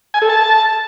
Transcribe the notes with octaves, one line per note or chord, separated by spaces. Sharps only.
G#5
A4
A5